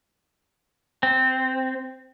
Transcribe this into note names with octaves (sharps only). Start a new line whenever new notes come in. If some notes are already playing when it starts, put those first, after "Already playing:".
C4